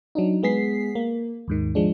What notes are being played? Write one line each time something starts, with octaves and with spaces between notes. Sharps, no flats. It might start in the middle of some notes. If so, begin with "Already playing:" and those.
F#3 D4 D#4
G#3 B3 G#4 B6 C7
A#3
D#2 G#2 D#3
F3 G#3 D4